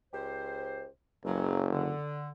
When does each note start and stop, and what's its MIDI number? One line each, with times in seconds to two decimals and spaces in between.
0.13 0.87 37
0.13 0.87 67
0.13 0.87 72
1.24 1.93 30
1.24 1.65 37
1.24 1.65 49
1.24 1.65 54
1.72 2.29 50